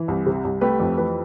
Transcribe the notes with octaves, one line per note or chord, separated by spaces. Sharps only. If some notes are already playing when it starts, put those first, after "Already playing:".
Already playing: E3
C2
C3
C2
A3 G4 B4
F2
E3 G4 B4